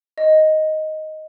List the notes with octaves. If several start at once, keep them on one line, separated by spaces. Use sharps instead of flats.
D#5